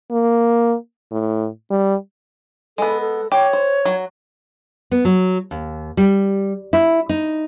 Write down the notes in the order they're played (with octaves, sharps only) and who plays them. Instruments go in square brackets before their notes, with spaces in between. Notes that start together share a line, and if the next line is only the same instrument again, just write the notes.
[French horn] A#3
A2
G3
[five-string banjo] G#3 B3 [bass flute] A4
[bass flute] A4
[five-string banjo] G4 [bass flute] C#5
[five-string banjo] C5
F#3
[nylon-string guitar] B3
F#3
D#2
G3
E4
D#4